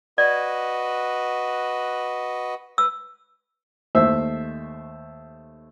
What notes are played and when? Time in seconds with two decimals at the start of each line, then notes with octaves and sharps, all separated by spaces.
0.18 F#4 B4 D5 D#5
2.78 B4 E6
3.95 D#2 A3 C5 E5 E6